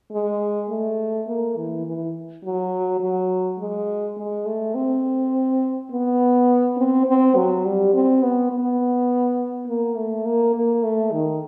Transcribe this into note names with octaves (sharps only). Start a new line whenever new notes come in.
G#3
A3
A#3
E3
E3
F#3
F#3
G#3
G#3
A3
C4
B3
C4
C4
F#3
G3
C4
B3
B3
A#3
A3
A#3
A#3
A3
D#3